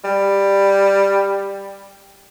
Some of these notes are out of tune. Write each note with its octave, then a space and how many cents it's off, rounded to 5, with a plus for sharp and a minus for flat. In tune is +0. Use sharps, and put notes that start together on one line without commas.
G3 +10